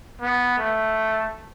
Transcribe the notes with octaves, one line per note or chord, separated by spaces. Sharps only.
B3
A3